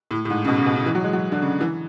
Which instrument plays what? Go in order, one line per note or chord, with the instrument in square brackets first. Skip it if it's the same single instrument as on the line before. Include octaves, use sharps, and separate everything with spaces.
[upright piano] A2
A2
G#2
C#3
B2
C#3
B2
C#3
E3
F#3
G#3
F#3
D3
C#3
E3